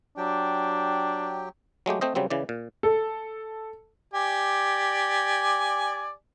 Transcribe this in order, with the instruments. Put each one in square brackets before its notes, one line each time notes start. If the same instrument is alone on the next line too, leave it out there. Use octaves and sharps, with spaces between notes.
[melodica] F#3 G4 G5 [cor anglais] D4
[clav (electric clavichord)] F#3 G#3 A3 G4
A3 C4 C5 D#5
C#3 F#3 G3 C4
C#3 E3 D5
A#2
[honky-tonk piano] A4
[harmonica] G4 D5 G#5